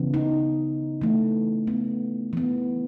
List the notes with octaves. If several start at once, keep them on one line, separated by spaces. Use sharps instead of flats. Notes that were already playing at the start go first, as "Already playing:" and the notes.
Already playing: C#3 E3 B3
D#4
E3 A3
B3
E3 B3